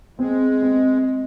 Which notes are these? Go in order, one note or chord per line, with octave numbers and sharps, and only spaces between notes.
G#3 C4
C4